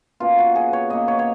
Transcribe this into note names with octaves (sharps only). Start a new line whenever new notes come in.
B2 A#3 C#4 F4
F#4
G#4
C#5
B2 A#3 C#4 D#5
C#5
C#5